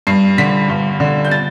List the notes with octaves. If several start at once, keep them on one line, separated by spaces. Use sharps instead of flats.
G2 C7
D3 B6
G2
D3
G6
A6